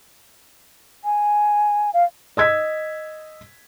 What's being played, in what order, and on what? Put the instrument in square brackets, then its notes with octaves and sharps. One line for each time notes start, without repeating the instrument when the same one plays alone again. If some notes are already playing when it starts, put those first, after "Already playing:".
[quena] G#5
F5
[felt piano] D#5 E6 G#6 B6